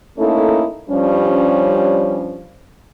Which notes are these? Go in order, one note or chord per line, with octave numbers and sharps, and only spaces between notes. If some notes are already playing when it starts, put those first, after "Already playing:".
A3 A#3 C#4 D#4 E4 A4
G2 F3 G3 C#4